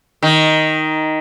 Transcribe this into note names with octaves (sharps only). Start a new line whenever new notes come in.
D#3